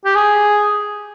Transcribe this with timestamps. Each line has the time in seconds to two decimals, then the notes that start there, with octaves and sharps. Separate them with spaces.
0.05 G4
0.15 G#4